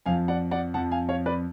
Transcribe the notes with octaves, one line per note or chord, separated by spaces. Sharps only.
F2 F3 F5 G#5
D5 F#5
D5 F#5
F2 F3 F#5 A5
F5 G#5
C#5 F5
B4 D5